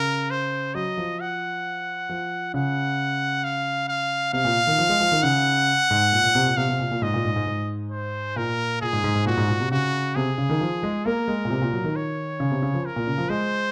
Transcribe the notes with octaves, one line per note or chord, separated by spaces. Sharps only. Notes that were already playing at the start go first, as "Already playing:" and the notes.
Already playing: C#3 A#4
C5
F#3 D#5
F3
F#5
F3
C#3 F#5
F5
F5
C3 F5
A#2
D#3
F3
G#3
F3
D#3
C#3 F#5
G#2
A#2
A#2
C3
A#2
C3 F5
C3
A#2
A#2
G#2 D#5
A#2
G#2
G#2
G#2
C5
A#2 A#4
A#2 G#4
G#2
G#2
G#2
A#2 F#4
G#2
A#2
C3
C#3 F#4
C3 G#4
C#3
D#3
F3
G#3
A#3 A#4
G#3
A#2
C3
A#2
F#3
D#3
C#5
C#3
C3
C#3
F3
A#4
A#2
C#3
F3
G#3 C5